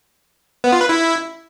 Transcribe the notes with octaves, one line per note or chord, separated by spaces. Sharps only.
B3
F4
B4
E4